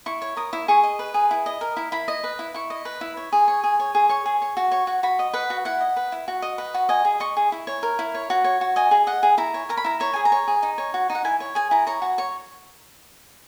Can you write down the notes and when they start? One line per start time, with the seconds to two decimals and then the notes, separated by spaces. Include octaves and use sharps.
0.06 E4 C#6
0.22 C#5
0.36 A#4 D#6
0.53 E4
0.68 G#4 C#6
0.83 D#5
0.99 B4
1.14 G#4
1.31 E4
1.46 D#5
1.61 A#4
1.77 E4
1.92 E4 B5
2.08 D#5
2.24 B4
2.39 E4
2.54 E4 C#6
2.70 D#5
2.85 B4
3.01 E4
3.17 C#5
3.32 G#4
3.48 C#5
3.64 G#4
3.80 C#5
3.95 G#4
4.09 C#5 C#6
4.26 G#4
4.42 C#5
4.57 F#4
4.72 C#5
4.87 F#4
5.03 F#4 B5
5.19 D#5
5.33 B4 F#5
5.50 F#4
5.65 E4 F#5
5.80 D#5
5.96 B4
6.12 E4
6.28 F#4
6.42 D#5
6.58 B4
6.74 F#4
6.89 D#5 G#5
7.05 G#4
7.20 D#5 C#6
7.37 G#4
7.52 E4
7.67 C#5
7.83 A#4
7.99 E4
8.15 C#5
8.30 F#4
8.44 C#5
8.61 F#4
8.76 D#5 G#5
8.91 G#4
9.07 D#5 F#5
9.23 G#4
9.38 E4 A#5
9.54 C#5
9.69 A#4 A#5
9.77 B5
9.85 E4 A#5
10.00 C#5 A#5
10.14 G#4 G#5
10.25 A#5
10.32 C#5
10.48 G#4
10.63 D#4
10.78 C#5
10.94 F#4
11.10 D#4
11.15 F#5
11.25 E4 G#5
11.40 C#5
11.55 G#4 G#5
11.71 E4 A#5
11.87 C#5 A#5
12.02 F#4
12.18 C#5